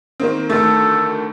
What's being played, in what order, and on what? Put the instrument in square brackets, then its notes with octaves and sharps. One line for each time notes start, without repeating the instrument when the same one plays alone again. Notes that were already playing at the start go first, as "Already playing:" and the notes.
[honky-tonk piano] D#3 A#3 C4
[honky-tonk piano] D2 D#3 A3 [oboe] A4